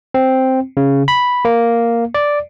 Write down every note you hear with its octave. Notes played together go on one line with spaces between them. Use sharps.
C4
C#3
B5
A#3
D5